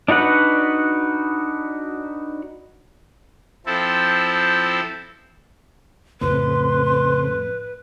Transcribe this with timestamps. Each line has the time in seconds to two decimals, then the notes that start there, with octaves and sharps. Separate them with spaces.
0.08 D4 D#4 F#4 B4 F#5
3.66 F3 C4 E4 A4
6.21 F2 A2 C#3 A3 C4 B4 C6